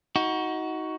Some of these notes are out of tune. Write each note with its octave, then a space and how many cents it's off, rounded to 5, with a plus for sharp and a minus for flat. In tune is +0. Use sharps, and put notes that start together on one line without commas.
D#4 +25 F#4 +5